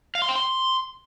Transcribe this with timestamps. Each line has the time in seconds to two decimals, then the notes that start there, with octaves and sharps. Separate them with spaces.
0.15 F5
0.22 C6
0.29 G5
0.36 C6